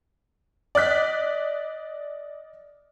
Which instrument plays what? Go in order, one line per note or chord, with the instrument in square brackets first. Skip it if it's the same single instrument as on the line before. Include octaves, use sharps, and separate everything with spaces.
[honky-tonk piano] D5 D#5 F#6 B6